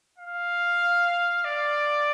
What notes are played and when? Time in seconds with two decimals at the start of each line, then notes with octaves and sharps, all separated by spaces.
0.18 F5
1.44 D5